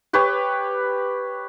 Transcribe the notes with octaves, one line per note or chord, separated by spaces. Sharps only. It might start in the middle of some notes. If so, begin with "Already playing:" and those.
G4 B4 C#5